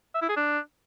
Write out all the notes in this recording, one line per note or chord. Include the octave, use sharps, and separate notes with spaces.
E5
E4
G#4
D4